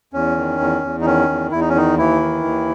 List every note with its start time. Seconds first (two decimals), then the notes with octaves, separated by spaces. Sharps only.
0.13 E2 C#4
0.37 D#3
0.60 E2
0.83 E2
1.01 D#4
1.05 D#3 C#4
1.29 E2
1.52 E2 E4
1.60 D#4
1.69 C#4
1.75 D#3 D#4
1.98 D#2 E3 E4
2.21 D#3
2.44 D#2